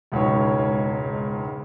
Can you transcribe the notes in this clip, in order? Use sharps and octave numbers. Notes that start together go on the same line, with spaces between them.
E1 C#2 G#2 C#5